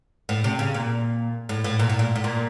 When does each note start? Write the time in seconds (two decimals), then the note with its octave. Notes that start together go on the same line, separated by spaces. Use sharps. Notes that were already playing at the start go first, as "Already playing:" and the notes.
0.29 A2
0.44 C3
0.59 C#3
0.74 A#2
1.49 A2
1.64 A2
1.79 A#2
1.89 A2
1.99 A#2
2.15 A2
2.24 A#2